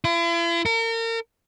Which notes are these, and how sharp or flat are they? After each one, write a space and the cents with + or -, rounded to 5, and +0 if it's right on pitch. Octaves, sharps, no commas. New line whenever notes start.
E4 +45
A#4 -35